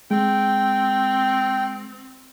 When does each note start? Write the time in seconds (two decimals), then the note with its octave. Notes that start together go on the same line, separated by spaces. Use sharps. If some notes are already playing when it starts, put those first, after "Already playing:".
0.11 G#3 C4 G5